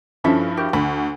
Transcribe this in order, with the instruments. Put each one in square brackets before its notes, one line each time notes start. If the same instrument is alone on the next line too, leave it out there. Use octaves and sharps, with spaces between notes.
[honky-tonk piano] G2 F3 E4 [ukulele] C#4 A4 E5
[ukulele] F#4 G4 A#4
[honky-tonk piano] D2 [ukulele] B5